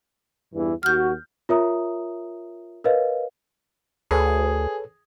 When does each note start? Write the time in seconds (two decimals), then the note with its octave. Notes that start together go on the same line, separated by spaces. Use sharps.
0.54 E2 G2 E3
0.83 D#2 F#4 F6 G6
1.49 F4 A#4 C#5 E5 A#5 D#6
2.84 A#4 B4 C#5 D#5 F5
4.11 D2 G#4 A4 B4 C#5